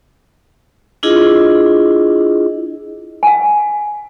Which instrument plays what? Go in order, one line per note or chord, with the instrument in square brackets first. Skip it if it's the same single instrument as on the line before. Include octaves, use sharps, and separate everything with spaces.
[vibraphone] D4 E4 F4 G#4 D#5
[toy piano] F#5 G#5